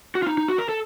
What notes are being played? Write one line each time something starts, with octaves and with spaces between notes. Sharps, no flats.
F#4
F4
D#4
D#4
F#4
A#4
A4